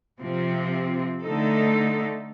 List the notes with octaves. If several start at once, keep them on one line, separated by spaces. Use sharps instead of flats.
C3 F3 C4
D3 A3 D#4 A4